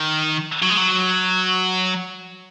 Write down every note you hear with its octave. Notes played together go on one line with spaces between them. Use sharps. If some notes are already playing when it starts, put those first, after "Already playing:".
Already playing: D#3
F#3
G#3
F#3